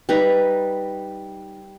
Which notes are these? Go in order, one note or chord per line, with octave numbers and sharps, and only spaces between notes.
G3 D#4 B4 A#5